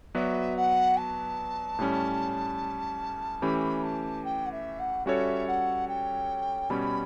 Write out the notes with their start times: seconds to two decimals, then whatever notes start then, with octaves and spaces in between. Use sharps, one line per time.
0.15 F#3 B3 F#4 B4 D5 E5
0.56 F#5
0.97 A5
1.79 A2 G3 C#4
3.42 E3 A3 C#4 G4 B5
3.83 A5
4.24 G5
4.46 F#5
4.51 E5
4.79 F#5
5.06 G3 C#4 F#4 A4 C#5 E5
5.47 F#5
5.88 G5
6.70 B2 G3 C#4 B5